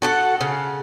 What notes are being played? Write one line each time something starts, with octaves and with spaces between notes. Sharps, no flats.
F#4 A4 F#5
C#3